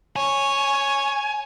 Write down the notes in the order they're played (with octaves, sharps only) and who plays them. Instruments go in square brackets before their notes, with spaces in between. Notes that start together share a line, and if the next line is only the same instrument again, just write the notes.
[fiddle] C#5 [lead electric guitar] G#5